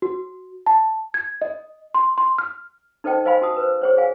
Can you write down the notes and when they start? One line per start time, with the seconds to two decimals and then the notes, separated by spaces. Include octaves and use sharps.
0.02 F#4
0.66 A5
1.14 G#6
1.42 D#5
1.95 C6
2.18 C6
2.38 F6
3.04 D#4 A4 C5 D#5 G5 A5
3.25 C5 D#5 F5 G#5 B5 C6
3.42 F#4 A5 D#6
3.56 B4 C5
3.81 G#4 C5 C#5
3.97 G#4 F5 G#5